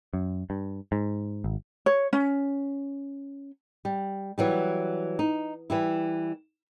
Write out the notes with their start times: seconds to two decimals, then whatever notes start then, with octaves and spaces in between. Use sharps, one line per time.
0.13 F#2
0.50 G2
0.92 G#2
1.44 G#1
1.86 C#5
2.13 C#4
3.85 G3
4.38 E3 F#3 G3
5.19 D#4
5.70 E3 G3 E4